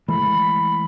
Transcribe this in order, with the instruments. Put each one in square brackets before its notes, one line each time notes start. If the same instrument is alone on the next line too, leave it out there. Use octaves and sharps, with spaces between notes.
[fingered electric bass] E3 G#3 A3 [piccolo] B5